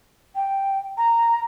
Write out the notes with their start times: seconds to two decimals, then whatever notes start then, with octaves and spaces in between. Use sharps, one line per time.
0.35 G5
0.97 A#5